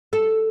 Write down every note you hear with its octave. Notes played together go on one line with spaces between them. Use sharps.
A4